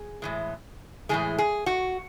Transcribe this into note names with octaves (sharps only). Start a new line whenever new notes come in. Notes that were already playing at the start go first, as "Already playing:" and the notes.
Already playing: G#4
A2 E3 G#3
A2 E3 G#3 G#4
G#4
F#4